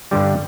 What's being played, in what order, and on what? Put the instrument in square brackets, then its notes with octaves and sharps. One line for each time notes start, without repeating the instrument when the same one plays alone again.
[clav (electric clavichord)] G2 D3 G3